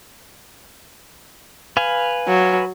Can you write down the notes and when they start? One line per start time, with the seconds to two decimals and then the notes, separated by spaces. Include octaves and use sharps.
1.77 B4 F5 G#5
2.28 F#3